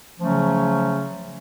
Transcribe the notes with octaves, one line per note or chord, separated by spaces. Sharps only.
C#3 F3 F#3 A3 C#4